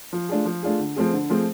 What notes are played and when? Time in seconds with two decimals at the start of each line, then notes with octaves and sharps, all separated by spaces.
0.13 F3
0.29 A3 D4 F4 G#4
0.45 F3
0.63 A3 D4 F4 G#4
0.79 D3
0.96 F3 A3 C4 G#4
1.13 D3
1.30 F3 A3 C4 G#4